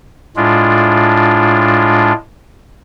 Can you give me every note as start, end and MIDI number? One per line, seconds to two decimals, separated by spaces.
0.36 2.12 45
0.36 2.12 56
0.36 2.12 62
0.36 2.12 65